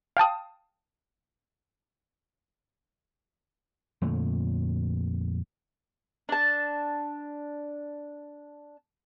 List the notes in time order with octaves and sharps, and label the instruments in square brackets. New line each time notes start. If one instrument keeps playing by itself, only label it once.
[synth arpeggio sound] F5 G5 A5 D#6
[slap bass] F2 A#2 D3 A3
[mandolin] D4 A5